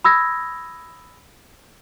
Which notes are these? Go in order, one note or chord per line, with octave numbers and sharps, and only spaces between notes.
B5 D#6 E6 G#6 A#6